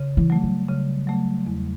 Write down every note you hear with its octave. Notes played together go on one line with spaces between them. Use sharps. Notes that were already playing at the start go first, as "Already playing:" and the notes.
Already playing: C#3
E3
F#3 A3
G3
C#3
F#3 A3
E2